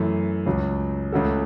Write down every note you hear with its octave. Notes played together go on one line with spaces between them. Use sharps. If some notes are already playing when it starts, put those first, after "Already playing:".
Already playing: F#2 E3 A3
C#2 C#3 F#3
C#2 C#3 A3 F#4 A4